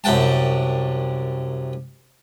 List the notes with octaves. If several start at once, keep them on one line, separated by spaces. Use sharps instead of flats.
C2 F#2 F#5 G5 A5